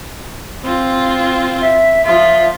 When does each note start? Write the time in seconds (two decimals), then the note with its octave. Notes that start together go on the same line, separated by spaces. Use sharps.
0.64 C4 F4
1.61 E5
2.05 F3 F4 E5